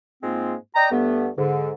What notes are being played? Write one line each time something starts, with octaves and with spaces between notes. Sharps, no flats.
G#2 G#3 A#3 C4 F4
D5 D#5 G5 A#5
G2 A3 B3
G#2 D3